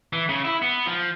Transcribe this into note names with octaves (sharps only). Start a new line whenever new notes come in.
E3
C#3
E4
B3
F3